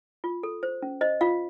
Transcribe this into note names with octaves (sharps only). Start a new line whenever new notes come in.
F4
A4
C5
C#4
C5 D#5
F4 F5